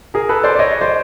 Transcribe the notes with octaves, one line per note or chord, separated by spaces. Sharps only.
G#4 A#4
A4 B4
C5 D5
D5
C#5 D#5
C5 D5